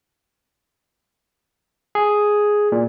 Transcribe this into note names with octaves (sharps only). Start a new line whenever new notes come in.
G#4
A#2